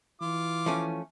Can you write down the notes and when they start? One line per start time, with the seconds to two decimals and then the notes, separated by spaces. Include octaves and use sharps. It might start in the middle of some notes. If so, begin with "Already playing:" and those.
0.21 E3 F4 D6
0.66 F3 A3 C#4